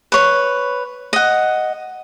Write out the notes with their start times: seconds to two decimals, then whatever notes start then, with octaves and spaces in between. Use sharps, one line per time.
0.12 B4 C#5
1.13 D#5 F#5